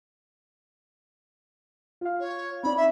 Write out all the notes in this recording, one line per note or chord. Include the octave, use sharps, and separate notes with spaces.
F4 F5
C#5
C4 D#4 D5 B5
E5